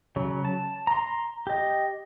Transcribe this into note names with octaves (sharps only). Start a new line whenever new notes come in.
C#3 F#3
A5
A#5 C6
G4 D#5